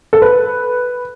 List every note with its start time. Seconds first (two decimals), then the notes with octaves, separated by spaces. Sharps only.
0.13 A4
0.22 B4